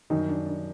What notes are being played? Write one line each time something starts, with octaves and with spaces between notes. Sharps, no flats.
F#2 D#3 G3 D#4
D4
D4